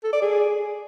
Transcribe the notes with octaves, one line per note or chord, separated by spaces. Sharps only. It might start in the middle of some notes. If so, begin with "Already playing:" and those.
A4
D5
G#4